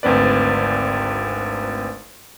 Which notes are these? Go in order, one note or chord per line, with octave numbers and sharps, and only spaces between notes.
G#1 D2 C4 B4 D5